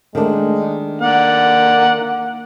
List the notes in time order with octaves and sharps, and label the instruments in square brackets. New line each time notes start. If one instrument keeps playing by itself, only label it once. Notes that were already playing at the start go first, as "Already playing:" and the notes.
[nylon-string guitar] D#3 A3 D4 [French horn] G#3
[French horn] A#3 [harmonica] D5 F#5